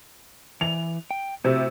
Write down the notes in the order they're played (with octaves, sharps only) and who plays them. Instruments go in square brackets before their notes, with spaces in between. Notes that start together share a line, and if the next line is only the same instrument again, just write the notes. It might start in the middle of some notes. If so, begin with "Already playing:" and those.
[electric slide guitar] E3 [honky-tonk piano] F7
[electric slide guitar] G5
[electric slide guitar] A2 F#4 E5 [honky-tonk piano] C3